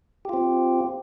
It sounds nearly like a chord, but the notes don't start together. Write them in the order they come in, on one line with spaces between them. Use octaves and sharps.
G4 F4 C4